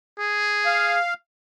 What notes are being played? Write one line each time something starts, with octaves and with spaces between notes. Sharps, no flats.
G#4
F5